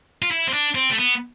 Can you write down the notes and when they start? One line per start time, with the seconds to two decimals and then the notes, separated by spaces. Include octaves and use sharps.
0.22 F4
0.31 E4
0.47 C4
0.53 D4
0.75 C4
0.91 A3
0.98 B3